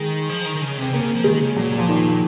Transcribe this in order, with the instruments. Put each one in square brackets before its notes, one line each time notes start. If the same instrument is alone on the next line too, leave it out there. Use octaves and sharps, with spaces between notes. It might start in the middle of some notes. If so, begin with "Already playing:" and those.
Already playing: [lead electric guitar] D#3 [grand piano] G#3
[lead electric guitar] F3
D#3
D#3
C#3
[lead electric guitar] C3 [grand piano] C4
[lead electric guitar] C#3 [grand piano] A#3
[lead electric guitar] F3
[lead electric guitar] D#3 [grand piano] G#3
[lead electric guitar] C#3
[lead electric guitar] A#2 [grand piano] F#3
[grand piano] F3
D#3